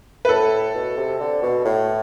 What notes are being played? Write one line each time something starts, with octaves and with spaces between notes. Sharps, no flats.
B4
A2 A4
B2
C3
D3
B2
A2